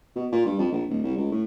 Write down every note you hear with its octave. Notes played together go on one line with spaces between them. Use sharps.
B2
A#2
G2
F2
A#1
D1
C2
C#2
A2